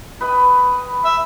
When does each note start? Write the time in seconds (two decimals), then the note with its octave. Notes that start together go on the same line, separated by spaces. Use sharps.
0.21 B4 D#5 G5
1.04 E5